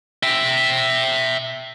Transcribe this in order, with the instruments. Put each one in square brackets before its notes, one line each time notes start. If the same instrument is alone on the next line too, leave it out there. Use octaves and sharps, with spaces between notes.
[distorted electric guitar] E5 G5